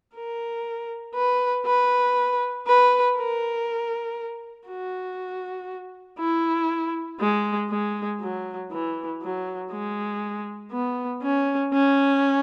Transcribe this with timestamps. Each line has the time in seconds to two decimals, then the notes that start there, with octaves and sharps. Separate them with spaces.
0.15 A#4
1.15 B4
1.66 B4
2.67 B4
3.17 A#4
4.68 F#4
6.19 E4
7.20 G#3
7.69 G#3
8.21 F#3
8.71 E3
9.22 F#3
9.71 G#3
10.72 B3
11.22 C#4
11.73 C#4